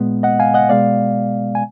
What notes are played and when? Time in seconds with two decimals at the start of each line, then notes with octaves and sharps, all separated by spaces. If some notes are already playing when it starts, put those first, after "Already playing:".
Already playing: A#2 G#3 B3
0.23 D#5 F#5
0.40 F5 G#5
0.54 D#5 F#5
0.69 B2 G#3 B3 D5 F5
1.55 G#5